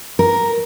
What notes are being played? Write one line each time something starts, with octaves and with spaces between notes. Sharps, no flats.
A#4